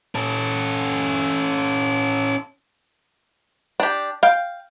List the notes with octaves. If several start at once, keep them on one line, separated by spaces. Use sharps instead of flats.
C#4 A4
D4 G4
F5 G5